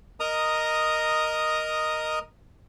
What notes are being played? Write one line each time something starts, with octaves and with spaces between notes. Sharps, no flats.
A#4 D#5 A#5 D#6